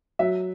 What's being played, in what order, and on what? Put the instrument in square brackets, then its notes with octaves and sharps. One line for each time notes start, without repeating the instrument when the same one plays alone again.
[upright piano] F#3 E5